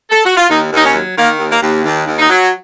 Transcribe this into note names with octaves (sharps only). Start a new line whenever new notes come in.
A4
F#4
F4
D#2 D#4
D#2 D#4
C#4
F#3
D#3 A#3
D#2
A#3
D#2
D#2
D#2
D#4
F#3